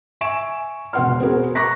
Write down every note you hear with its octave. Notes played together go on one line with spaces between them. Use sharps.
E5 G#5 C#6 D7 E7
E1 B2 B4 F#5 C6 F6
B3 C4 F#4 G#4 A#4 B4
A#5 C#6 D6 F#6 A#6 B6